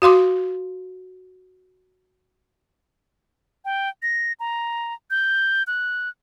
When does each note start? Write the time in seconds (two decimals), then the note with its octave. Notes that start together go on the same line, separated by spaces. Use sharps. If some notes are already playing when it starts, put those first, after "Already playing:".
0.02 F#4 F5 C6 D6
3.65 G5
4.02 A#6
4.40 A#5
5.11 G6
5.67 F#6